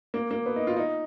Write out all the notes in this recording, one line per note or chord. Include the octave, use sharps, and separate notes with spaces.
A#3
A#3
B3
D#4
F4
D#4